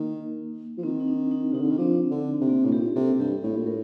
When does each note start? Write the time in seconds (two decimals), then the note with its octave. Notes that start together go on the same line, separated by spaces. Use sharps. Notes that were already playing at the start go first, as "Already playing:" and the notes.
Already playing: D#3 A#3
0.78 F3
0.83 D#3 C4
1.00 D#4
1.08 D4
1.31 D#4
1.53 C3 D#4
1.61 D3
1.70 D#3
1.78 F3 D4
2.10 D3
2.41 C3
2.49 A#3
2.65 A2
2.72 A#2 G4
2.95 C3 A4
3.19 G2 G4
3.43 A2 A4
3.56 A#2
3.66 A2 A#4